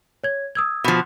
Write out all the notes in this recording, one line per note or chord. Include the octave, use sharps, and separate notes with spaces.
C#5 G#6
D#6 E6 G#6
B2 F3